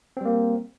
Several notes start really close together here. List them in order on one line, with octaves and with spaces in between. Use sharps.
C4 G3 A#3